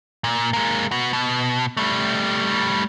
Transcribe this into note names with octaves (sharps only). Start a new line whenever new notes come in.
A#2
G#3 A#3
B3 F#4
B2
G3 A3